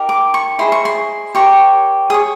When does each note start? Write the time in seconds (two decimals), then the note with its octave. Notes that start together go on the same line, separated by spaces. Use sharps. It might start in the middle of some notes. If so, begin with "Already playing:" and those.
Already playing: D#4 G4 A#4
0.09 D6
0.34 C#6
0.59 E4 G#4 C5 D#5 C6
0.72 C#6
0.85 C6
1.35 G4 A#4 C#5 C#6
2.10 G#4 D#6
2.14 C#5